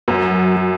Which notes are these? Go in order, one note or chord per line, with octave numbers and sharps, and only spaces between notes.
F#2 F#3 F#4